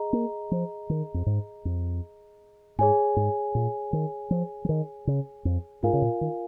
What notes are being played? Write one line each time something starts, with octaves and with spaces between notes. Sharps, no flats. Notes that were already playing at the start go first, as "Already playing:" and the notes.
Already playing: G#4 D#5 A#5
A#3
F3
D#3
F2
G#2
F2
G#2 G#4 C#5 G#5
G#2
A#2
D#3
F3
F3
D#3
C#3
F2
G#2 F4 A#4 F5 G#5
C#3
A#2
D#3